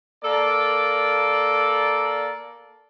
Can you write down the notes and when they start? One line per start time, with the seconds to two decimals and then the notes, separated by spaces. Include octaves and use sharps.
0.23 A#3 A4 D5